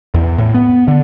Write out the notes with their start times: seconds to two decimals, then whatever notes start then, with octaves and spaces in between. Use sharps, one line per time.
0.14 E2
0.38 A2
0.54 B3
0.88 D3